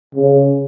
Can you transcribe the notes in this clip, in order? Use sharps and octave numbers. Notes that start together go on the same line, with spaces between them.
C#3